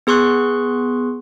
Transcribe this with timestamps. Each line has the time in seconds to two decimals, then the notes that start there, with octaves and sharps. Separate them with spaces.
0.07 B3 G#4 C6 C#6 F#6